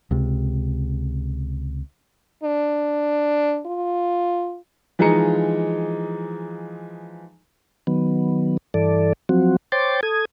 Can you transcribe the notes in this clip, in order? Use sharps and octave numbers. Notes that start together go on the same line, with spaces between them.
C#2 C3
D4
F4
E3 F3 G#3 D#4 A#5 C#7
D#3 F#3 B3
G2 E3 A4 D5
F3 F#3 C4 F#4
C5 C#5 G5 C6 D6 A6
A4 D#6 G#6